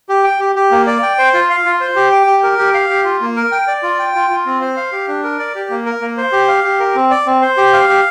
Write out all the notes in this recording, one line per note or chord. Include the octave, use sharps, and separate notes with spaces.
G4
G5
G4
G4
A#3
D5
G5
C5
F4
F5
F4
C5
G4
G5
G4
A#4
G4
F5
G4
F4
A#3
A#4
G5
D5
F4
G5
F4
F4
C4
C5
F5
G4
D4
A#4
D5
G4
A#3
A#4
A#3
C5
G4
F5
G4
A#4
C4
D5
C4
C5
G4
F5
G4